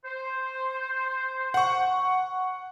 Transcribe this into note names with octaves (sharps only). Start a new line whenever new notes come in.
C5
F#5 C#6